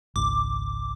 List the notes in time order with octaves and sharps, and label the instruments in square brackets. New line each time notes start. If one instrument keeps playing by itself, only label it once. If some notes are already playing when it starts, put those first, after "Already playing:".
[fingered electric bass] G#1 C#2 [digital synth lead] D6